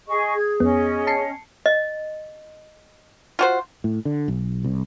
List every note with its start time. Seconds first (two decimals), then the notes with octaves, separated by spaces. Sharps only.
0.07 G#4 D#5 C#6
0.35 G#4 G#6
0.60 F2 B3 C#4 D#5
1.07 A5 C7 C#7
1.66 D#5
3.39 F4 F#4 C5
3.84 A2
4.05 D3
4.28 B1
4.64 C2